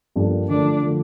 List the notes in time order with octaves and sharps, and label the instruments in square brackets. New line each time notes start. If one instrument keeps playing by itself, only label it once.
[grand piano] G2 F3 A#3 D4 A4
[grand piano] D3 F3 A3 [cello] D4
[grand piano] D3 F3 A3